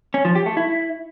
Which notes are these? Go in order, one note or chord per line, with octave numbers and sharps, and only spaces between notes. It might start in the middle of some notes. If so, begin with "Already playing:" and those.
C#4
F3
G4
A3
E4